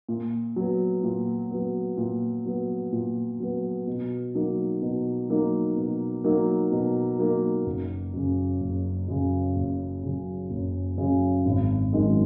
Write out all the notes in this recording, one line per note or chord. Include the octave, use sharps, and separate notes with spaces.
A#2
F#3 B3
A#2
F#3 B3
A#2
F#3 B3
A#2
F#3 B3
B2
F#3 A#3 D#4
B2
F#3 A#3 D#4
B2
F#3 A#3 D#4
B2
F#3 A#3 D#4
F#1
F#2 C#3
F#1
F#2 C#3
F#1
F#2 C#3
F#1
F#2 C#3
G#1
F#2 D#3 G#3